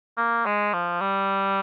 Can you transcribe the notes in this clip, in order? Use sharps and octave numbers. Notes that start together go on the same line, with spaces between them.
A#3
G#3
F3
G3